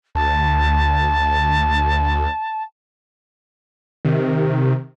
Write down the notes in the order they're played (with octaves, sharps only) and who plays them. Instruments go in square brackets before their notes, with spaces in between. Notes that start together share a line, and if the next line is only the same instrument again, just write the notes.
[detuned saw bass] D2 [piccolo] A5
[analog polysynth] C3 D#3